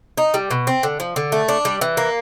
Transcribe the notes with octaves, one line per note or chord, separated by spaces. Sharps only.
D#4
G3
B2
C4
D3
F3
D3
A3
D4
G3
E3
A#3